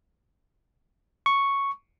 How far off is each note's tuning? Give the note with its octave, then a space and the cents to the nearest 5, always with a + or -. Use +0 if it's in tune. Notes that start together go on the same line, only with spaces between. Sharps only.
C#6 +0